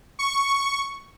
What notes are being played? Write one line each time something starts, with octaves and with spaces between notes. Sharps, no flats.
C#6